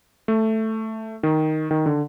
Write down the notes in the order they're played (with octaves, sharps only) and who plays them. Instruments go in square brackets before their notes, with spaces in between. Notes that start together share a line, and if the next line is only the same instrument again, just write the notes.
[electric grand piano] A3
D#3
D#3
D3